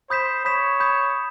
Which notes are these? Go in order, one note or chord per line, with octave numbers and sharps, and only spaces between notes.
C5 B5 D#6 G6 B6 E7
C#5 B5 D#6 G6 B6 E7
B5 D#6 G6 B6 E7